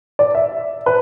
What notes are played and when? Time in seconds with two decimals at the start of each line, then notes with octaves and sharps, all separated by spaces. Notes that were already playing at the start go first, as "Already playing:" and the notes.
0.19 D5
0.35 E5
0.86 B4